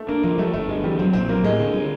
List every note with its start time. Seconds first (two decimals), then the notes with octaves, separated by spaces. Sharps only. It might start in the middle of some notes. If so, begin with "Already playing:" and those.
Already playing: A3
0.08 A#3 D4
0.23 F3 A#3
0.38 G3 A3
0.53 G1 A3
0.68 G2 G#3
0.84 E3 G3
0.99 F#3 C4
1.13 A#1 C4
1.28 F#3 A#3
1.44 A2 G#3
1.60 D3
1.74 G3